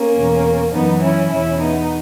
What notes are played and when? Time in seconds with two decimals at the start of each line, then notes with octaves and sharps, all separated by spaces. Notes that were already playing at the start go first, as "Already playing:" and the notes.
Already playing: A#3 C#4
0.14 E2 B2
0.72 F#2 E3 B3 D#4
1.02 C#4 E4
1.31 E2 B2 C#4 E4
1.60 B3 D#4